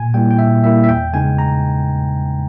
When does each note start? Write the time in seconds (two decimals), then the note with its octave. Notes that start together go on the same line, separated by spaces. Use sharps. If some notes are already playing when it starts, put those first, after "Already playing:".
Already playing: A#2 G#5
0.14 G3 A#3 E4 G5
0.31 G5
0.39 A#2 E5
0.64 G3 A#3 E4 E5
0.84 E5
0.89 E2 G5
1.13 C#3 G#3 B3 D#4 G#5
1.39 A#5